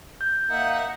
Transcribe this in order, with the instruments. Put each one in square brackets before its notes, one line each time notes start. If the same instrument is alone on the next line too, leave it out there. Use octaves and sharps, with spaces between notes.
[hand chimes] G6
[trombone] A#3 [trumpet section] D#4 [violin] E5 F#5